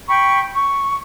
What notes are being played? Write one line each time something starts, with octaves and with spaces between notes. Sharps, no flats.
G5 B5 C#6
C#6